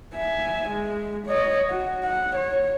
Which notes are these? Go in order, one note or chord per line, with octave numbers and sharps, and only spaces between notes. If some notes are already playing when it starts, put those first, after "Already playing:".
E5 G#5
G#3
C#5 D#5
F#4
F#5
C#5